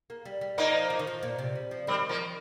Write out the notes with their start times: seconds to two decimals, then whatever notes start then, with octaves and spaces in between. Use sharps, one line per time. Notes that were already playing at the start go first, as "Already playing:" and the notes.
0.10 A#3
0.25 G3
0.41 G3
0.58 F3 A#3 D#4
0.90 F3
0.99 D#3
1.07 F3
1.23 A#2
1.39 C3
1.55 G3
1.71 F3
1.87 D#3 G3 C4
2.09 F3 A#3